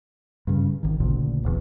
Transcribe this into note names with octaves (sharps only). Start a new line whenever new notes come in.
G2 C#3
G#1 D#3
A1 D2 A#2 C#3
D1 E2